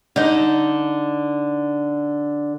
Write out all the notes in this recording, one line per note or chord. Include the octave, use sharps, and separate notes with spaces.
D3 D#4